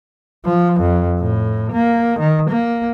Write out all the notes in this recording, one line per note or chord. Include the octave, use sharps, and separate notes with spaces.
F3
F2
A2
A#3
D#3
A#3